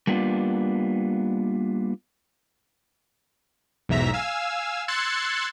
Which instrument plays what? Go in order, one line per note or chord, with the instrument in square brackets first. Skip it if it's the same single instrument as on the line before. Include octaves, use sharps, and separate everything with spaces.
[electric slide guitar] G3 A#3 B3 D4 F4
[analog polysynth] B1 E2 G#2 E5 A#5 B6
F5 G#5 E6
C6 E6 F#6 G#6 A6 C#7